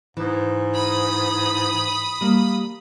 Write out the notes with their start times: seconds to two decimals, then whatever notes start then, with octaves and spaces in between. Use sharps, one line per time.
0.17 G#2 E3
0.75 B5 D#6
2.21 G3 A#3